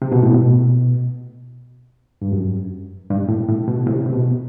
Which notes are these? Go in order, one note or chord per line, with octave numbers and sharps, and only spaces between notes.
C3
B2
A2
B2
G2
F#2
G2
A2
A2
B2
A2 C3
C3
B2